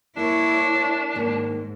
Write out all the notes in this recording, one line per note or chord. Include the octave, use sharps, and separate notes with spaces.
A#3 D4 E4 A4 A#4 C#5
G#2 D#3 A#3 C#5